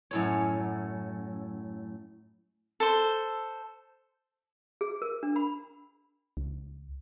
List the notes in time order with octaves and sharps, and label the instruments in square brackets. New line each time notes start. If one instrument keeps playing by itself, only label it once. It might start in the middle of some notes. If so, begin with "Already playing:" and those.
[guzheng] F#2 A2 C#5
[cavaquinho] A4 C5
[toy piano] G#4
A#4
D4
B5
[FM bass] C#2